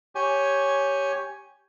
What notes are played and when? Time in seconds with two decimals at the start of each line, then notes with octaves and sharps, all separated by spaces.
0.15 G4 C#5 G#5